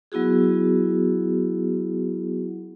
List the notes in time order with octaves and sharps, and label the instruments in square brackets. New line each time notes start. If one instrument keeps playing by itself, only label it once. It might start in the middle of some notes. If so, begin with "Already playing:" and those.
[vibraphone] F#3 B3 E4 F#4 G#4